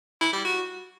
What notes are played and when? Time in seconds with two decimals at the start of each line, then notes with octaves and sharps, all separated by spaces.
0.21 E4
0.33 G3
0.45 F#4